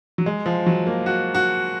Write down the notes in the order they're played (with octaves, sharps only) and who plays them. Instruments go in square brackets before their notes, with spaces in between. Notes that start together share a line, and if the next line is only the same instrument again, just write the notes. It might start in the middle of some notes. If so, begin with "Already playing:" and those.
[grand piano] F#3
G#3
F3
F#3
A#3
F#4
F#4